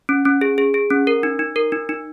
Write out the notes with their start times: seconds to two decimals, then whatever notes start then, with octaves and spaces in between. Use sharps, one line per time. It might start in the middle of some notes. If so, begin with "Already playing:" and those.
0.09 C#4
0.25 C#4
0.41 G#4
0.58 G#4
0.74 G#4
0.90 C#4
1.07 A#4
1.23 D#4
1.39 D#4
1.56 A#4
1.72 D#4
1.89 D#4